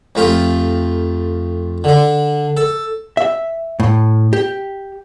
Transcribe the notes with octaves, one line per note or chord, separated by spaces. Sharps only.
F2 A3 F4 G4
D3 D4
A4
E5
A2
G4